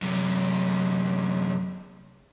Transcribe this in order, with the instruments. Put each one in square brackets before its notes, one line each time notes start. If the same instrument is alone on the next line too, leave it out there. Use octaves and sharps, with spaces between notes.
[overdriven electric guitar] F#2 C3